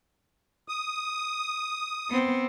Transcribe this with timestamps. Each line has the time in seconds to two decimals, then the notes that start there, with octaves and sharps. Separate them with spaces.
0.68 D#6
2.10 B3 C4